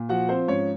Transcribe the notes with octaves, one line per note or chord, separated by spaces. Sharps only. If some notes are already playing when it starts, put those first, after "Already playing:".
Already playing: A#2
F3 F#4 F#5
C4 C5
G#2 C#4 C#5